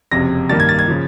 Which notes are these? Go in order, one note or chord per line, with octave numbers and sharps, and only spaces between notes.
F#1 F2 C3 A#6
G2 D#3 G3 A#3 A6
G#6
A6
G#6
C#3 F3